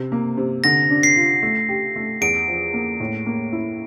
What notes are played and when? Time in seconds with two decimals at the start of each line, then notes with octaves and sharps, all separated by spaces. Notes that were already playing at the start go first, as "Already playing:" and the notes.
Already playing: C3
0.12 A#3
0.37 C3
0.64 D3 A#6
0.90 D4
1.03 C7
1.16 F4
1.42 A3
1.69 G4
1.96 A3
2.21 E2 D7
2.48 F3
2.73 A#3
3.00 A2
3.26 A#3
3.53 E4